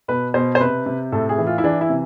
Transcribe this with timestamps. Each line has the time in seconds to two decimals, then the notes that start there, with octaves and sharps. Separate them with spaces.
0.08 B2 B4
0.34 B2 C5
0.55 C5
0.60 C3 B4
0.86 C3
1.12 A2 A4
1.29 G#4
1.38 E3
1.47 F4
1.58 E4
1.64 E3 D4
1.81 E4
1.90 C3